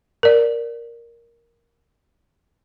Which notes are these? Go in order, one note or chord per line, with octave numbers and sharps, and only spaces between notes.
A#4 D5